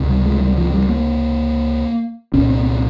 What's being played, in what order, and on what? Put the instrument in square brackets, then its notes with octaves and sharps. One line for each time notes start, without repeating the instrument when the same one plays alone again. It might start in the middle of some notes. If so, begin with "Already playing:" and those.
Already playing: [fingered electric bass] C#2 C3
G3
G#3
G3
F3
G3
A#3
C2 A#2 C#4
C4
C4